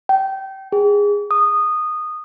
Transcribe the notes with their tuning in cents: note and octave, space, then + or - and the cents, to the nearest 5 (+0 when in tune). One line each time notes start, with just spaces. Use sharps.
G5 -25
G#4 -20
D#6 -15